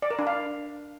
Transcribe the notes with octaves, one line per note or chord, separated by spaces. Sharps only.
D5
A#4
D4
F5